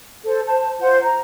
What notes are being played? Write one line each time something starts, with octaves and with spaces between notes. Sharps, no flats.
A4 C5
C5 A5
F4 C5 F#5
A#5